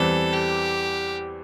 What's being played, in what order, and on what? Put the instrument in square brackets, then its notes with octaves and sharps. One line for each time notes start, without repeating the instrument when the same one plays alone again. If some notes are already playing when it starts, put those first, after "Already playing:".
Already playing: [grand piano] E2 E3 G3 C4 [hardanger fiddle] A4
[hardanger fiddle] G4